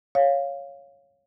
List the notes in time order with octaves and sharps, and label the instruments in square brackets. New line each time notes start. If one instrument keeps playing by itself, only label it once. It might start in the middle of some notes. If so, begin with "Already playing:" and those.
[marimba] C#5 F5